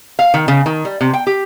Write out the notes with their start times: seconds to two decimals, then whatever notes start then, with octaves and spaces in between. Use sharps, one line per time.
0.19 F5
0.34 D#3
0.48 C#3
0.66 D#3
0.85 G3
1.01 C3
1.13 G5
1.27 G4